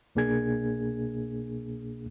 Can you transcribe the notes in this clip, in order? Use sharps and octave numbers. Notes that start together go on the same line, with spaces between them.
C2 B2 A#3 D4 G#4 G#6